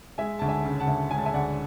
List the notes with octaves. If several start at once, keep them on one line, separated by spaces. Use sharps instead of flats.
G#3 E5 G#5
D2 A5
E5 G#5
C#3
F#5 A5
D2
G#3 G#5
A5
E5 G#5
D2 D5 F#5